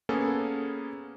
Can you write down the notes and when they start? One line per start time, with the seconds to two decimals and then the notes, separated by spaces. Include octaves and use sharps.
0.09 A#3 B3 C#4 G#4 A4